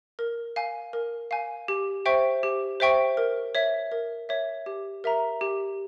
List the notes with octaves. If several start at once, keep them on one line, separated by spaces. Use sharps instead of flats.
A#4
F5 G#5
A#4
F5 G#5
G4
C5 E5 G5 C#6
G4
C5 E5 G5 C#6
A#4
C#5 E5
A#4
C#5 E5
G4
A#4 E5 A#5
G4